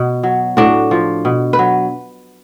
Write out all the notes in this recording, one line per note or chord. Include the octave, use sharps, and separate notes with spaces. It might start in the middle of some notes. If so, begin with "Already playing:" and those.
Already playing: B2
F#3
A2 D4 F#4
F3
B2
B4
F#3